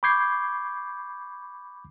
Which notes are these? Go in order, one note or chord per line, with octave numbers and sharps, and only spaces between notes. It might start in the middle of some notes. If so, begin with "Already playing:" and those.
B5 C#6 D6 G6 G#6 C7